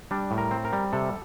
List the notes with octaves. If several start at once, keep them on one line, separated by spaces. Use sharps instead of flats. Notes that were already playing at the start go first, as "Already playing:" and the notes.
G3 D4
A2
A#4
C4
A#4
G3
C3 A4